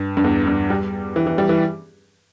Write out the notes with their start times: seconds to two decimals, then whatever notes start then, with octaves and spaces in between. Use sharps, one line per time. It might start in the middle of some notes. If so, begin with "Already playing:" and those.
Already playing: G2
0.17 G2
0.24 E2
0.47 G2
0.70 G3
1.16 E3
1.27 E3
1.38 G3
1.49 E3